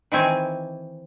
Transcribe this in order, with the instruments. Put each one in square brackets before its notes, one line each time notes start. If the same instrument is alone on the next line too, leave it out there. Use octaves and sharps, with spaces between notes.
[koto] D#3 E3 C4 G#5